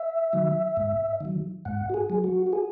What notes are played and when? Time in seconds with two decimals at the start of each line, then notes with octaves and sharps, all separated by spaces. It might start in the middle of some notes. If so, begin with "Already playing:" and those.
Already playing: E5
0.33 D#3 F#3
0.77 G#2
1.20 D#3 F#3
1.65 G#2 F#5
1.89 F#4
1.94 G#4
2.10 F#3
2.24 F#4
2.46 F#4
2.53 G#4